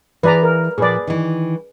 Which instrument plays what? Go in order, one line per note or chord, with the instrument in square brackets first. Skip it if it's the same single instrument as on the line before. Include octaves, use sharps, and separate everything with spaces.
[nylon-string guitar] E3 G#4 G#5 [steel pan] B4 D5 A#5
[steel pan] A#4
[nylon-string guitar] A#2 F3 [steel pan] G#4 B4 D5
[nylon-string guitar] D#3 E3